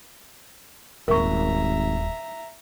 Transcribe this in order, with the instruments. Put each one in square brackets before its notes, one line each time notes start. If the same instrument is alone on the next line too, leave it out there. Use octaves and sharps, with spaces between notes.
[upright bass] D#1 [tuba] G#1 [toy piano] A#4 C#6 [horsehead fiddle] E5 A#5